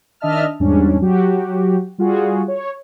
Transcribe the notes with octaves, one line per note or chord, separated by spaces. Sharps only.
D#3 D4 D#5 E5 A5 F6
E2 G#2 G3 C#4 D4
F#3 F#4 G4
G3 F4 F#4 G#4
C#5